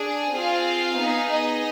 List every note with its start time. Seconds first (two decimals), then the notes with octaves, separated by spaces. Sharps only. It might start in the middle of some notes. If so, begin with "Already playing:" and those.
Already playing: D4 G#4
0.34 C4 F4 G#4 F5
0.99 B3 D#4 G#4
1.30 D#5